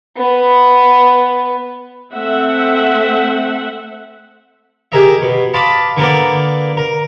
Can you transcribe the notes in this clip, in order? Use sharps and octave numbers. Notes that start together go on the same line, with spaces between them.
B3 B4
A3 C4 E5 F#5
G4 G#4 A#4 D#5 E5
B2
D#5 F5 A5 B5 C6 D6
D3 A#3 B3 A#4 D5
A#4